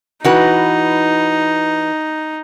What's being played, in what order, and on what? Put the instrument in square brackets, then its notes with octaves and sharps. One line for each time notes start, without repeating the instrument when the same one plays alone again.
[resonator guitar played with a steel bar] E3 F#4 B4 [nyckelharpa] D#4